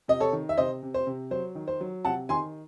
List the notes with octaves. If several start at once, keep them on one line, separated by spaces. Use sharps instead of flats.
C3 D#5
A4 C#5
D#3
E5
C3 C5 D#5
C3
C5
C3
F#3 C5
D#3
C5
F#3
C3 F#5 A5
D#3 G#5 C6